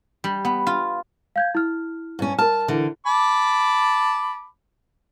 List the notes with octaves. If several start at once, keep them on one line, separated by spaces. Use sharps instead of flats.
G3
B3
F4
F5 G6 G#6
E4 F6
G2 C#4
A#4 A5 F6
D3 E3
A5 B5 D6